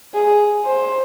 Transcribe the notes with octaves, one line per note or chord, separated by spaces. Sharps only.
G#4
C5